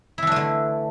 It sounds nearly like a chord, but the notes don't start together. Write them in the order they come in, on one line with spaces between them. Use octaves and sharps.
E4 E3 D4 A3 D3